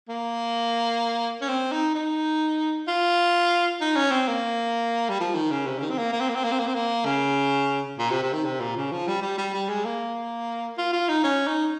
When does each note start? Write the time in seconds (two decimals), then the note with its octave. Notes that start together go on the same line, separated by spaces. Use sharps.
0.09 A#3
1.41 C#4
1.49 C4
1.72 D#4
1.94 D#4
2.87 F4
3.81 D#4
3.96 C#4
4.11 C4
4.27 A#3
5.09 G3
5.20 F3
5.35 D#3
5.51 C#3
5.66 C3
5.79 C#3
5.82 D#3
5.90 C4
5.98 A#3
6.13 A#3
6.21 C4
6.29 A#3
6.35 C4
6.44 A#3
6.52 C4
6.59 A#3
6.67 C4
6.75 A#3
7.05 C#3
7.99 A#2
8.11 C3
8.23 C3
8.33 D#3
8.45 C3
8.60 A#2
8.77 C#3
8.92 F3
9.08 G3
9.22 G3
9.38 G3
9.54 G3
9.69 G#3
9.85 A#3
10.78 F4
10.93 F4
11.09 D#4
11.24 C#4
11.47 D#4